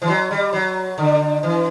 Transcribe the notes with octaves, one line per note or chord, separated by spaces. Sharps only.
E3
F#3
G3
F#3
D3
E3